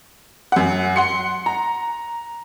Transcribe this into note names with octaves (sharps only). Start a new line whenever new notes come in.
F#2 F#5
F#5 C6 C#7
A#5